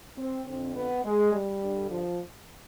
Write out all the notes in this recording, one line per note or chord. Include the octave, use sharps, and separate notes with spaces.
C4
F2 D3 C4
B3
G#3
G3
G2 D3
F3